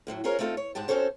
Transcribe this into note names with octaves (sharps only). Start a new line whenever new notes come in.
F#2 A2 F3 F#3
C#4 F4 G#4 A#4 C5 C#5
A3 C4 D#4 F4 G#4 A4
C#5
G#2 G#3 G4 A5
C4 C#4 F#4 A4 C5 C#5